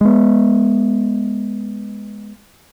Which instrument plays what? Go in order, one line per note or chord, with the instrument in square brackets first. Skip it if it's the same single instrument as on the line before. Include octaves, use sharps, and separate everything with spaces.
[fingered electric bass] G#3 B3